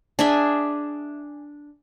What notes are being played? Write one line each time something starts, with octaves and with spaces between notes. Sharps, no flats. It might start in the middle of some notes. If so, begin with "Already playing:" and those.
D4 G#4 E5